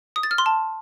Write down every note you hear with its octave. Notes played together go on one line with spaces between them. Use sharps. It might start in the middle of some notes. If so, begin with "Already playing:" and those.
D#6
A6
F6
C6
A5